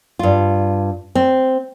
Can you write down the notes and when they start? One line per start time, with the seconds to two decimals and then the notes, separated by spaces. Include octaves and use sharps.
0.19 G2 F4
1.15 C4